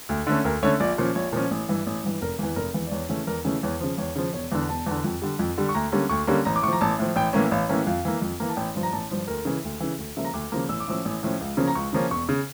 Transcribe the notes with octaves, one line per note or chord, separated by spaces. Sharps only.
D2
D3 A3 C#4
D2 A#4
D3 A3 C#4 C#5
A#1 D5
A#2 F3 C#4
A#1 C#5
A#2 F3 C#4
A1
G2 E3
A1
G2 E3
F1 A#4
E2 E3
F1 A#4
E2 E3
D5
E2 C#5
C#3 E3 A3 C#4
E2 A#4
C#3 E3 A3 C#4
E2 C#5
C#3 F3
E2 C#5
C#3 F3
E1 C#5
E2 D3
E1 A5
E2 D3
F2
D3 G3
F2
D3 G3
C#6
D2 A#5
D3 G3 A#3 C#4
D2 C#6
D3 G3 A#3 C#4
A1 A#5
D6
A2 C#6
F3
A#5
A1 A5
A2 F3
A1 G5
A2 E3 A#3 C#4
A1 F5
A2 E3 A#3 C#4
F2 F5
E3 A#3
F2
E3 A#3
A5
A1 G5
G2 F3
A#5
A1 A5
G2 F3
D2 A#4
C#3 E3
D2
C#3 E3
D2
C#3 F3 A#3 E5
A#5
D2 D6
C#3 F3 A#3
A1 E6
D6
A2 F3 C#4 E6
A1
A2 F3 C#4
C#2
C#3 F3 A#3 C#4
A#5
C#2 C#6
C#3 F3 A#3 C#4
E1 C#6
C#3